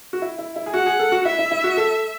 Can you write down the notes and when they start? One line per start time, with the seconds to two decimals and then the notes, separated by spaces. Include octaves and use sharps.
0.13 F#4
0.22 E4
0.39 E4
0.56 E4
0.66 G#4
0.74 F#4 F#5
0.86 G#4
0.99 A4
1.12 F#4
1.25 E4 E5
1.39 E4
1.51 E4
1.64 F#4
1.77 A4